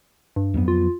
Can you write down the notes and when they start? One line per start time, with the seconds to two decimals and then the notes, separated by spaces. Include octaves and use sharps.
0.36 G2
0.54 F2 F#3 B3
0.68 F4